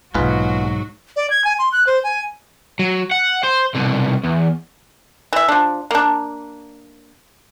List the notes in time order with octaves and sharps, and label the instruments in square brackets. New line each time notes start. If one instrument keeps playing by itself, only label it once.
[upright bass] B1 A#3 [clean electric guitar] G#2 [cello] F#3 F#4 [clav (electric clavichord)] F4 G#4 B4
[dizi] D5
G#6
G#5
C6
F#6
C5
G#5
[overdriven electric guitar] F#3
F#5
C5
C2 B2
E2
[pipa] E3 E5
F3 D4
A#3 D4